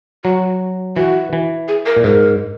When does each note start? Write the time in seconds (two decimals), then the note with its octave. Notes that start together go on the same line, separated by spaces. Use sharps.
0.25 F#3 F#4
0.96 E3 F#4
1.33 E3
1.68 G#4
1.86 A#4
1.97 A#2
2.04 G#2 A#4